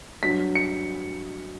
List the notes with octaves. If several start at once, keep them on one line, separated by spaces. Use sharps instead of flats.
G2 F#3 B6
C#7